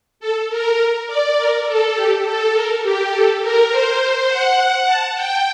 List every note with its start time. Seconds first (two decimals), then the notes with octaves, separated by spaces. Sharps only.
0.20 A4
0.50 A#4
1.07 D5
1.36 A#4
1.66 A4
1.95 G4
2.25 A4
2.54 A#4
2.83 G4
3.12 A4
3.41 A#4
3.71 C5
4.28 F#5
4.87 A5
5.15 G5